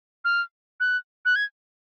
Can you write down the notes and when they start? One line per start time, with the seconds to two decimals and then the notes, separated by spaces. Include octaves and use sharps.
0.24 F6
0.80 F#6
1.25 F#6
1.36 G#6